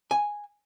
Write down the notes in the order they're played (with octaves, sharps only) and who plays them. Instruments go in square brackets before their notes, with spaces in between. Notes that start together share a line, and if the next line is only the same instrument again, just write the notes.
[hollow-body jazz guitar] G#5